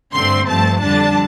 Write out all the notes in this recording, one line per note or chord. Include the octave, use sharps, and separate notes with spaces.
G2 D3 A3 C4 C6
G2 F3 A3 C4 A5
F2 D3 G3 D4 A5